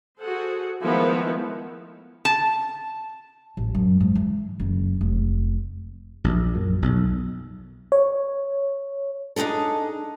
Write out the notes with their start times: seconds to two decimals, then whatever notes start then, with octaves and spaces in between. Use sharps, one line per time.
0.21 F#4 G#4 A4 C5 F#5
0.83 D#3 F3 G#3 A3 B3 E4
2.25 A5
3.57 A1
3.75 F#2
4.00 G#2
4.15 E3
4.60 F#1
5.01 F1
6.24 A#1
6.55 F#2
6.82 B1
7.92 C#5
9.36 D4 D#4 F4 G#4 A4